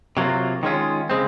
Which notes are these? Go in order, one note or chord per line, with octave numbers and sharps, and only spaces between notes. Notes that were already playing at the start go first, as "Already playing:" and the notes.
C3 F#3 A#3 F4
D#3 G#3 C#4 F4
C#3 G#3 C4